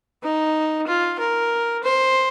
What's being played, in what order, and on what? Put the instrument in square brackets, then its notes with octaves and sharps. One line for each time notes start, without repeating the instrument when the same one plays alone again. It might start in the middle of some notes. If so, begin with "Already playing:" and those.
[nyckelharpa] D#4
F4
A#4
C5